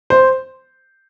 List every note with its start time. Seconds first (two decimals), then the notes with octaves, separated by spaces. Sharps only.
0.10 C5